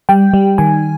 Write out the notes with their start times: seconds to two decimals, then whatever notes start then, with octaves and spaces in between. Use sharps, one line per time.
0.09 G3 G5
0.34 G3
0.58 D#3 G#5